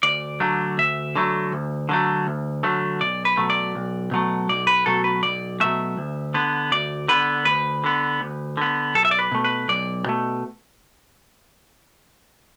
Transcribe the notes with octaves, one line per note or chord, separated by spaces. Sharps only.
D2 D5
D3 F#3 A3
D2 E5
D3 F#3 A3
D2
D3 F#3 A3
D2
D3 F#3 A3
B1 D5
B4
B2 F#3 A3
D5
B1
B2 F#3 A3
B1 D5
B4
B2 F#3 A3 A4
B4
B1 D5
B2 F#3 A3 E5
D2
D3 B3
D2 D5
D3 B3 B4
D2 B4
D3 B3
D2
D3 B3
B1 A4
E5
D5
B4
B2 A3
B4
B1 D5
B2 A3